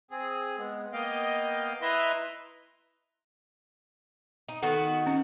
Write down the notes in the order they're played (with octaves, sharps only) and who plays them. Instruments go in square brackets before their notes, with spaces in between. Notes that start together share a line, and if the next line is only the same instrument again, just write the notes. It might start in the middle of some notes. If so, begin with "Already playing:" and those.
[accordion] C4 G#4
G#3 B3
A#3 B3 D#5 F5 G5
E4 B4 D#5 E5 A#5 C6
[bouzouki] D#4
[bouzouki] D#3 B3 F#4 [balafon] A4
[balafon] C#4 F#5